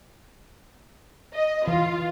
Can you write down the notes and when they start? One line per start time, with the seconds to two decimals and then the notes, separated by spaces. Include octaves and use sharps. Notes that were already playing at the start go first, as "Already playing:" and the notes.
1.35 D#5
1.68 E3 F4